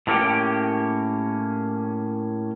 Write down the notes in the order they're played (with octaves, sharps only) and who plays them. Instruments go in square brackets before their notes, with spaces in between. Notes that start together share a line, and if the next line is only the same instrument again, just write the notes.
[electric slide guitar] A2 D3 A#3 C#4 G4 G5